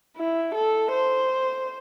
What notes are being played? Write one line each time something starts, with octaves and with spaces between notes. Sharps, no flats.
E4
A4
C5